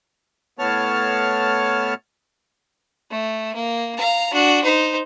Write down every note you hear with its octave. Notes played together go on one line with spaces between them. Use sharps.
A2 B3 C#5 A5 F6
A3
A#3
F5 A#5
D4 F#4
D#4 C5